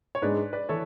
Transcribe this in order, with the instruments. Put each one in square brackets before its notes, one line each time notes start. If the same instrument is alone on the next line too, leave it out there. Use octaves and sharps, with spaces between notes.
[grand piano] C#5
[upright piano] G#2 G#3 D4 [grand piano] B4 D5
[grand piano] B4 D5
[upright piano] E3 [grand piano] A4 C#5